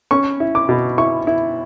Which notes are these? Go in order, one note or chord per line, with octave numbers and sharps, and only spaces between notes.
C#4 C#6
E4
D6
B2
E4 C#6
E4